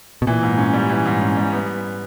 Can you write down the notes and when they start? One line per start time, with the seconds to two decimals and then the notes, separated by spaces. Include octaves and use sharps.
0.22 B2
0.27 A#2 E3
0.43 G#2
0.58 C#4
0.74 G3
0.90 E3
1.05 G#2
1.21 C#4
1.37 G3
1.52 B3